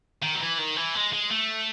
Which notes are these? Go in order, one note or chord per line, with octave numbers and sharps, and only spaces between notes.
D#3
F#3
E3
D#3
E3
G#3
G#3
A3